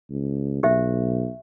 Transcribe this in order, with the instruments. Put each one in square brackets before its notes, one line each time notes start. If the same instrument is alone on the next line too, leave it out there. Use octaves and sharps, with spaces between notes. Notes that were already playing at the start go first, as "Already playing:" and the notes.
[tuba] C#2
[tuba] B1 [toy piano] G4 C5 E5